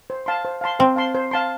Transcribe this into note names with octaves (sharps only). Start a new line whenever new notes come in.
C5
F5 A5 C6
C5
F5 A5 C6
C4 C5
F5 A5 C6
C5
F5 A5 C6